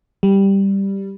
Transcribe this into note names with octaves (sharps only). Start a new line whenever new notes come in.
G3